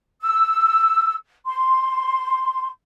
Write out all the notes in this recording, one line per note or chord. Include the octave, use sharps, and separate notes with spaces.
E6
C6